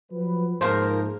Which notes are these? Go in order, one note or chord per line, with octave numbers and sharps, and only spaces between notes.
F3 F#3 B4
G#2 F3 A#3 A#4 C5